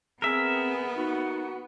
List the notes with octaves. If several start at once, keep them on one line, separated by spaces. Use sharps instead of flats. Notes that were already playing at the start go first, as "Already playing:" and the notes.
B3 C4 G#4 A#4 E5
D#4 F#4